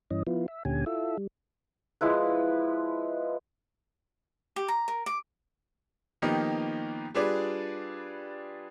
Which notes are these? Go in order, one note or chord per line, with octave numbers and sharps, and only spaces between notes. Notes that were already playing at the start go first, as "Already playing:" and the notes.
G2 E3 C#4 D#5
F3 B3 E4 F4
E5
D2 A#2 D3 C#4 G4 G#5
E4 F4 A4 E5
G3
F3 G#3 E4 B4
G4
A#5
A#4
D6
D#3 F3 A#3 B3 D#4 G4
G3 D4 F4 G#4 B4 D5